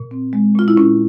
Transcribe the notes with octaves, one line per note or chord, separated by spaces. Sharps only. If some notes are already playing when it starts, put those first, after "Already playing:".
Already playing: A#2
C4
G#3
A#2 F4
E4
A#2 C#4